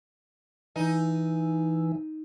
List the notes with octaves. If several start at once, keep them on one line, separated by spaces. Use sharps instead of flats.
E3 D#4